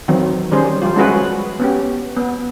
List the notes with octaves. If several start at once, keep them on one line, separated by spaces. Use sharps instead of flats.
D#3 E3 F#3 C4
D#3 G3 C#4 G#4 C5
F3 G3 F4
G#3 C#4 E4 F#4 G#4 B4
B3 C#4 G4
B3